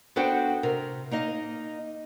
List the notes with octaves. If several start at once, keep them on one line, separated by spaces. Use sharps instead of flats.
B3 D4 F#4 A4 C5 G5
C3 A#4
A#3 D#4 D#5 F5